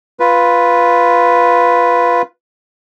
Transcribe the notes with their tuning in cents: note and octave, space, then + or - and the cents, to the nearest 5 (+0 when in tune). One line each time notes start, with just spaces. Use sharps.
F4 +0 B4 +0